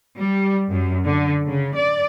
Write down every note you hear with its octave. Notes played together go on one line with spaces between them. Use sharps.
G3
F#2
D3
C#3
D5